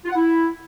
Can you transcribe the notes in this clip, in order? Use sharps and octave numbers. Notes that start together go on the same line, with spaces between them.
F4
F#5
E4